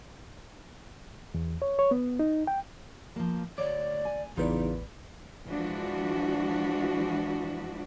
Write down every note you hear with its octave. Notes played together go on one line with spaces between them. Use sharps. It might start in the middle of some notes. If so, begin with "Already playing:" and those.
E2
C#5
C#5
B3
D#4
G5
F3 A#3
D2 C#5 D5 D6
G#5
A1 E2 C#3 D#4 F4 A#4 B4 D5
E3 F3 G#3 D4 F#4